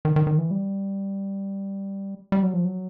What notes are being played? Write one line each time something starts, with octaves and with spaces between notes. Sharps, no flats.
D#3
D#3
D#3
E3
G3
G3
F#3
F3
F#3